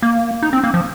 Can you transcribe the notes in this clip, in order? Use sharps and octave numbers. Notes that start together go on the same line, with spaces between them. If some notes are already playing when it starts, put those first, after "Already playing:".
A#3
D#4
C4
A#3
F3